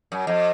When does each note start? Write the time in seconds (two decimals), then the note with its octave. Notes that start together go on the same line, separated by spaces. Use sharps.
0.12 F#2
0.27 F2